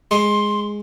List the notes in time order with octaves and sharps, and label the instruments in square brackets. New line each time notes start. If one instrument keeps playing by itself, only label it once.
[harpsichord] G#3 [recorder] C6